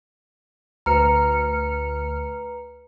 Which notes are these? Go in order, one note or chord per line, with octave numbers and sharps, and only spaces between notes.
D2 B4 A#5 F6 C#7